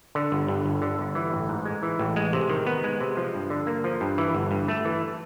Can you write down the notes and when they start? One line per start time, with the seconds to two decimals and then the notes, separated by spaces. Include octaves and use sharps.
0.15 D3
0.32 G1
0.48 G2
0.66 G1
0.82 D3
0.99 G1
1.15 E3
1.32 A1
1.49 G#2
1.66 G#3
1.83 E3
1.99 A1
2.16 G#3
2.33 C3
2.50 D#3
2.67 B3
2.84 G#3
3.00 C3
3.17 F3
3.34 G2
3.50 D3
3.67 A#3
3.84 F3
4.01 G2
4.18 E3
4.35 G1
4.51 G2
4.68 A3
4.85 E3